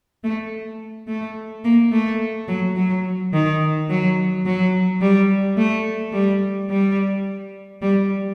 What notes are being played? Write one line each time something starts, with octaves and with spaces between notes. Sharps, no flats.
A3
A3
A#3
A3
F#3
F#3
D#3
F#3
F#3
G3
A3
G3
G3
G3